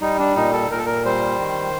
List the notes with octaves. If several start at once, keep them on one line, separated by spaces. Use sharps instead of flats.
G3 D#4
D4
A#2 D#4
A4
A#2 A#4
A4
A#4
G3 C5
D#3